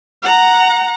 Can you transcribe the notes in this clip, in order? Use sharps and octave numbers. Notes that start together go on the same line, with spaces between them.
F#5 A#5